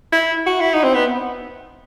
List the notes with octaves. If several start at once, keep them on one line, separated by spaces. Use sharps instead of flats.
E4
F#4
E4
D#4
C4
B3